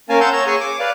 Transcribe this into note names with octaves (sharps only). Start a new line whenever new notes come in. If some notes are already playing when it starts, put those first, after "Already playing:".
A#3 C#4 A#4 F5 G#5 A5
F5 F#5 A5 C6 E6 G6
C#5 A#5 E6
G#4 G#5 C#6 D#6
D6
B4 D5 F5